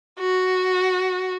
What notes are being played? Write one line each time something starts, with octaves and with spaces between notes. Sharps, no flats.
F#4